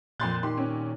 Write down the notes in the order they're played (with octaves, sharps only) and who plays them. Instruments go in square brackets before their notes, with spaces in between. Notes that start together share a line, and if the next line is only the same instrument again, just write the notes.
[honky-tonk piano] F2 C6 F#6 [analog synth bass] A#2 [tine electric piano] G6 A6
[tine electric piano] D#3 G4 [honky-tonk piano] C6
[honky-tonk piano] C4 C#4